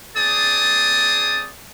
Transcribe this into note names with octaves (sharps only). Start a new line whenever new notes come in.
C4 G#4 D5 A5 D#6